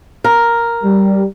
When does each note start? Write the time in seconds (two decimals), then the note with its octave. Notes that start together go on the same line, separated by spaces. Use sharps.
0.24 A#4
0.84 G3